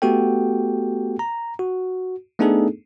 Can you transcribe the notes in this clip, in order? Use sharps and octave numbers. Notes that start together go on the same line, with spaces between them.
A3 B3 F#4 G4 A4 G5
A#5
F#4
A3 B3 D4 D#4 G#4 A4